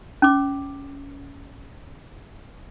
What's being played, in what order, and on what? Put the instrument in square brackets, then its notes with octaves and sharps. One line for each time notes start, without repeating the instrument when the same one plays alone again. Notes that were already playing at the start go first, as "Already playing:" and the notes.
[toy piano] C#4 D6